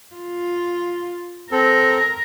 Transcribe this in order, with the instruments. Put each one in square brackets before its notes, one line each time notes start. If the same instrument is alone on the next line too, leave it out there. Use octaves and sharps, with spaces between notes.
[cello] F4
[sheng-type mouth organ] C4 A4 [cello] A#4